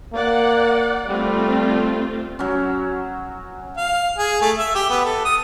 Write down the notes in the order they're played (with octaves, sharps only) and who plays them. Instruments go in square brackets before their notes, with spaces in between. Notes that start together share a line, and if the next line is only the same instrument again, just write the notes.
[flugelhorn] A#3 [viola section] D5 F#5
[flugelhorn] G3 [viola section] A3 C4 F4
[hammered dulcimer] F#3 C#4
[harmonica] F5
G#4
A3
E5
G4
B3
A4
D#6